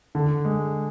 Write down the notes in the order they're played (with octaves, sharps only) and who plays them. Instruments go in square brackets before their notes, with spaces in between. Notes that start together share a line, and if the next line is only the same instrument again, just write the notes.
[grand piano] D3
G#3